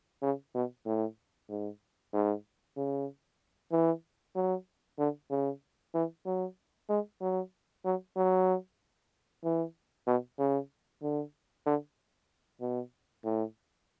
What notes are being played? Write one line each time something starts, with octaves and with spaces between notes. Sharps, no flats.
C#3
B2
A2
G#2
G#2
C#3
E3
F#3
D3
C#3
E3
F#3
G#3
F#3
F#3
F#3
E3
B2
C#3
D3
D3
B2
A2